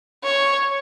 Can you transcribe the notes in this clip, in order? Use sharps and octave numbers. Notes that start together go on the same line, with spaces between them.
C#5